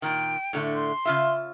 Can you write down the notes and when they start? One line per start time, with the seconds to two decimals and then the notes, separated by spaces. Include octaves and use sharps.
0.02 A#2 D#3 G5
0.53 A2 D3 A3
0.76 C6
1.05 C#3 F4 E5